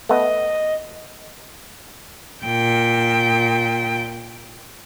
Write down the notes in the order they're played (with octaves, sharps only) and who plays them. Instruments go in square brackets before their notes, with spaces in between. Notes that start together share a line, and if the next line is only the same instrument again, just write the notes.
[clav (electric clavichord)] A3 B3 [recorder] D#5
[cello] A#2 G5